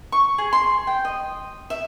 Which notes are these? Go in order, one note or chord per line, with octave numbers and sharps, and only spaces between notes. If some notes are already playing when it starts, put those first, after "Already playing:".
C#6
G#4
C6
G5
D#5
E5